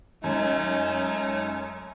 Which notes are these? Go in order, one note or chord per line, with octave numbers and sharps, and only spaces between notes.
F#2 G#3 A3 C#4 D#4 C#5